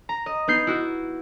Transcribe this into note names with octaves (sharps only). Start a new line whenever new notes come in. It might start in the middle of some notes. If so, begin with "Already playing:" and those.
A#5
D#5
B3 D#4 G6 C7
E4 F#4